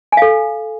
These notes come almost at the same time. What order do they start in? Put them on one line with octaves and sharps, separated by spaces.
G#5 F5 A4